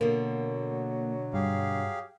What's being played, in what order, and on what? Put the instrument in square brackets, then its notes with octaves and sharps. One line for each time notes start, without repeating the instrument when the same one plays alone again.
[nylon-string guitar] B2 D3 [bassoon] F#3 [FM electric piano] A#3
[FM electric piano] G2 [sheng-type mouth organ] G4 G#4 F5